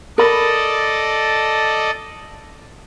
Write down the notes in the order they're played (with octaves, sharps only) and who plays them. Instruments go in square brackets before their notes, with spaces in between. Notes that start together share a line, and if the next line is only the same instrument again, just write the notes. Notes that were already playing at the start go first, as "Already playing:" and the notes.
[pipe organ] A4 D5 D#5 [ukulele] A#4 B5